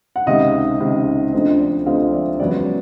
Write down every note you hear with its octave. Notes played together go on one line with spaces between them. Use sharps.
F#5
C#2 C3 D#3 D#5 F5
C#2 C3 D#3
D2 D3 F3 A3 C4 D#5
D5
D2 D3 F3 A3 C4 D#5 F5
D5 E5
E1 E2 C#3 F#3 B3 D5